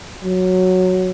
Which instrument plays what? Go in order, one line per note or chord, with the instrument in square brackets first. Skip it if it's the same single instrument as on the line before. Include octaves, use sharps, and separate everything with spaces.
[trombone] F#3